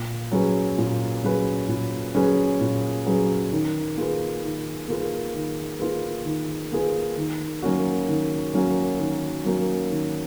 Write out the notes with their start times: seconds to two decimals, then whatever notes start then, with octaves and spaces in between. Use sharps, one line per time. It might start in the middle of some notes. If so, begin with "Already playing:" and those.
Already playing: A#2
0.32 F#3 C#4 G#4 B4
0.78 A#2
1.24 F#3 C#4 G#4 B4
1.68 A#2
2.14 F#3 C#4 G#4 B4
2.60 A#2
3.06 F#3 C#4 G#4 B4
3.52 D#3
3.97 A#3 F4 G#4 B4
4.43 D#3
4.88 A#3 F4 G#4 B4
5.35 D#3
5.80 A#3 F4 G#4 B4
6.25 D#3
6.72 A#3 F4 G#4 B4
7.17 D#3
7.62 F#3 A#3 C#4 F#4
8.08 D#3
8.54 F#3 A#3 C#4 F#4
8.99 D#3
9.45 F#3 A#3 C#4 F#4
9.91 D#3